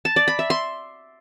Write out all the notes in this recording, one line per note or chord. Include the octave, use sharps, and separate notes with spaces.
A5
D5
B5
E5
C6